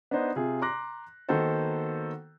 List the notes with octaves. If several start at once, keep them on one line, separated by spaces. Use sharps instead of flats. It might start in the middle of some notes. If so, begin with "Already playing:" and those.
B3 D4 D#4 C5
C3 F4 G#4
A#5 C6 D6 F#6 A#6
D#3 A#3 B3 F#4 A4 C5